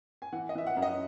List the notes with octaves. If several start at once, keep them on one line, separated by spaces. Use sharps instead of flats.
G#5
E3 F#5
D#5
E3 E5
F#5
F#2
D#5